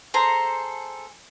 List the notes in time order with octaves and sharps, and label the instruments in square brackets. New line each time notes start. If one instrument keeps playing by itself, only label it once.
[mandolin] G#4 A4 C5 A#5